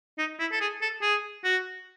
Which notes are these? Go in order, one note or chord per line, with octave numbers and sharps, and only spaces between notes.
D#4
E4
A4
G#4
A4
G#4
F#4